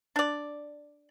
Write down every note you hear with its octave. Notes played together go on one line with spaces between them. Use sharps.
D4 D5